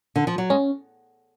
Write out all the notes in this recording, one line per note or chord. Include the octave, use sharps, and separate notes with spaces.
D3
F3
F#3
G#3 C#4